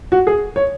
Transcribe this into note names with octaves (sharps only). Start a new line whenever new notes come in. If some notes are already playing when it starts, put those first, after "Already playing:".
F#4
G#4
C#5